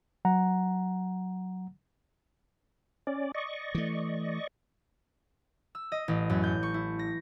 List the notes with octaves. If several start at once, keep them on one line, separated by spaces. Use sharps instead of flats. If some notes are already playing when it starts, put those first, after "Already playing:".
F#3 F#5 A#5
C#4 D5
D5 D#5 C#6
E3 A3
E6
D#5
A1
F#2
G6
C#6
E4
A#6